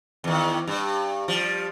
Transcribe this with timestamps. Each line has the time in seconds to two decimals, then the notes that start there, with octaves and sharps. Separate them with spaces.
0.24 E2 D#3
0.67 G2
1.28 F3 G3